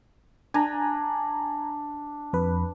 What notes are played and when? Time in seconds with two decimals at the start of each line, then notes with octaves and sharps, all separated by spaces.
0.54 D4 G#5 A#5
2.33 F2 B4